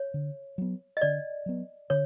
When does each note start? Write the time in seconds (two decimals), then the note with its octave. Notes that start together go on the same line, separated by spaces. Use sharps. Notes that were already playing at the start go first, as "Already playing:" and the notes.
Already playing: C#5
0.14 D3
0.58 F#3 B3
0.97 D#5
1.01 D3 D5
1.46 F#3 B3
1.90 D3 C#5